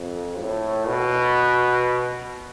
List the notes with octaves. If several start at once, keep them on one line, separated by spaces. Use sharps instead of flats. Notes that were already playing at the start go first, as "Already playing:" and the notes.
Already playing: F2
A2
B2